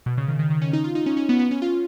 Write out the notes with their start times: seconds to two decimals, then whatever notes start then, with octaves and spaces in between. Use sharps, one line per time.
0.06 B2
0.17 C#3
0.28 D#3
0.39 D#3
0.50 D#3
0.61 C#4
0.73 D#4
0.84 F4
0.95 D#4
1.06 C#4
1.17 C#4
1.29 B3
1.39 B3
1.51 C#4
1.62 F4